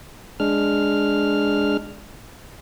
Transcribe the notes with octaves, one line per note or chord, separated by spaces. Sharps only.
G#3 D4 F6